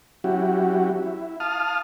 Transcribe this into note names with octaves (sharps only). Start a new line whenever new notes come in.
F#3 C#4 E4 F#4 G4
E4
F5 A5 D#6 F6